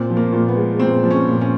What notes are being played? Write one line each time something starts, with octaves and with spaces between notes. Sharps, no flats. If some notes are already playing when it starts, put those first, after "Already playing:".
Already playing: A#2 C4
F3
A#3
A#2
B3
G#3
A#2 C4
F3
C#4
A#2
C#4